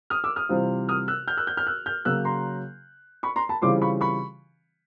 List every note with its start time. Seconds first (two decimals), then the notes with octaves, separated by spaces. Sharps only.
0.10 D#6 F6
0.24 D6 E6
0.36 D#6 F6
0.49 C3 E3 G3 C4 F4
0.89 D#6 F6
1.08 E6 F#6
1.28 F6 G6
1.37 E6 F#6
1.47 F6 G6
1.57 F6 G6
1.67 E6 F#6
1.86 F6 G6
2.05 C#3 F#3 A#3 E6 F#6
2.25 A#5 C6
3.23 B5 C#6
3.36 A#5 C6
3.49 A5 B5
3.62 C#3 E3 G3 C4 F4 C6 D6
3.82 B5 C#6
4.01 B5 C#6